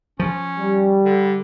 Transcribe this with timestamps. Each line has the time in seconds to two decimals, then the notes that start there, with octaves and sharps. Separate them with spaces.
0.19 F3 C#4
0.58 G3
1.05 D3